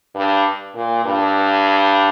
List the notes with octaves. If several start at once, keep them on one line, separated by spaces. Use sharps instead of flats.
G2
A#2
G2